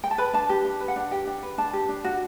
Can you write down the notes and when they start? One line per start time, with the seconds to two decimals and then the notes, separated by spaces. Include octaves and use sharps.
0.04 G5
0.11 A5
0.18 B4 B5
0.33 D4 A5
0.49 G4
0.65 D4
0.80 B4
0.88 F#5
0.96 D4
1.11 G4 G5
1.27 D4
1.43 B4
1.58 D4 A5
1.73 G4
1.89 D4
2.04 F#4